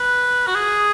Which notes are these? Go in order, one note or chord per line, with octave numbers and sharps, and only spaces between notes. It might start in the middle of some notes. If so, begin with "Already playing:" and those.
Already playing: B4
F#4
G#4